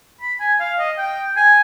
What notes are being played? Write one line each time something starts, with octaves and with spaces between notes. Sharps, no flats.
B5
G#5
F5
D#5
G5
G#5